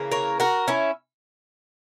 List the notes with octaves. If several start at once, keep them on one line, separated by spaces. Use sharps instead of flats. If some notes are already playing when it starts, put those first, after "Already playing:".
Already playing: C#3 E3 A#3
A#4 C#5
F#4 A#4
C#4 E4